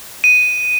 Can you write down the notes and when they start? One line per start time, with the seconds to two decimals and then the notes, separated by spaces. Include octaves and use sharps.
0.24 D#7